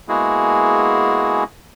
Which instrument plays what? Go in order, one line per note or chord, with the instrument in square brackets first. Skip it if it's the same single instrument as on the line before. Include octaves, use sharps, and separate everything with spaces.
[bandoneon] G#3 A#3 B3 E4 F#4 G#4